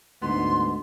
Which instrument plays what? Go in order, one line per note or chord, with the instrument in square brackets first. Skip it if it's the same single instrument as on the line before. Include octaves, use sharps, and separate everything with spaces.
[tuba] D2 [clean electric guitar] G#2 B3 [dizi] C6